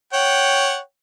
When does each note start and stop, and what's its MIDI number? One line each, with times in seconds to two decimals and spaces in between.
0.13 0.79 73
0.13 0.79 78
0.13 0.79 79